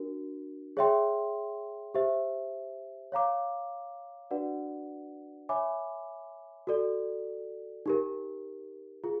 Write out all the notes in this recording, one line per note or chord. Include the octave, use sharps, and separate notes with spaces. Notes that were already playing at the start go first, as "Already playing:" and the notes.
Already playing: D4 F#4 A#4
G#4 C#5 E5 G5 C6
G4 C5 E5
C#5 F5 A#5 D6
D4 F#4 B4 D5 F#5
C#5 E5 G#5 B5 D6
F#4 A4 D5
D#4 G4 A#4
F4 G#4